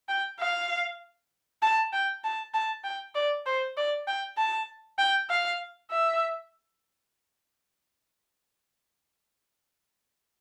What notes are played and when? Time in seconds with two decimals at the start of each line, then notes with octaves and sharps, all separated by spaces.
0.09 G5
0.40 F5
1.62 A5
1.93 G5
2.24 A5
2.54 A5
2.84 G5
3.15 D5
3.46 C5
3.77 D5
4.07 G5
4.38 A5
4.98 G5
5.30 F5
5.91 E5